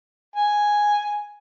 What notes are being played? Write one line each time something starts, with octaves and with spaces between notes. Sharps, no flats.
G#5